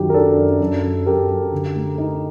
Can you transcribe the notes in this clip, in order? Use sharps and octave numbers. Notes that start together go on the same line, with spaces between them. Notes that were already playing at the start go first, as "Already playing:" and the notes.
Already playing: F#2 D#3 F#3 G4
A#4
D4 A4
F#2
F#2
F#2
F#2 G4 A#4
F#2
D3
A3
D#4